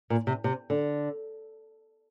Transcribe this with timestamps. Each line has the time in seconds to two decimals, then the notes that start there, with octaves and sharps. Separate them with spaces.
0.10 A#2
0.27 C3
0.44 C3
0.70 D3